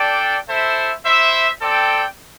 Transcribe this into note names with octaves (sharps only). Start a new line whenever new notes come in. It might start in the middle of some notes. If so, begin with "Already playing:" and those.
Already playing: D4 A4 D5 G5
E4 A4 C5 E5
E4 C5 E5
C4 A4 D5 G5